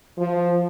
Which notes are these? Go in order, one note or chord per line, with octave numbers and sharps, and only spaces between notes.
F3